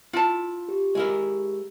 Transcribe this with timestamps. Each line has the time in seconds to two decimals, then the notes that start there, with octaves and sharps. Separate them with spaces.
0.13 E4 F4 A5
0.69 G4
0.95 G#3 E4 A#4